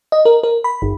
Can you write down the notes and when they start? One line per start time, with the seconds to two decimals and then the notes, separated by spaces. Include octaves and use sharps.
0.12 D#5
0.25 A#4
0.43 A#4
0.64 B5
0.82 G1